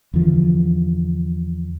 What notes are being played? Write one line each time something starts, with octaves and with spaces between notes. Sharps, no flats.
E2 D3 F3